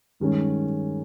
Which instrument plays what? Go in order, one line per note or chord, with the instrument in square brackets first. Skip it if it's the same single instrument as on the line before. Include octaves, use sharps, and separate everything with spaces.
[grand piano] G2 D#3 G#3 C#4